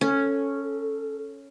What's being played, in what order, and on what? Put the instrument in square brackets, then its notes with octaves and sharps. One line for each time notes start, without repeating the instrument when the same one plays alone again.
[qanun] C#4 [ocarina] A4